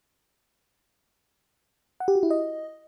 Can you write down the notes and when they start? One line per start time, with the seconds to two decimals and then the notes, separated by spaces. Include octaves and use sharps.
2.00 F#5
2.08 G4
2.15 F#4
2.23 E4
2.30 D#5